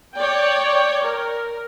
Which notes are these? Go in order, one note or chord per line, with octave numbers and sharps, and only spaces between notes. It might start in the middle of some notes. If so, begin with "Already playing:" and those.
C#5 D5 G5
A#4